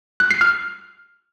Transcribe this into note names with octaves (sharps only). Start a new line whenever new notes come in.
F#6
C7
F6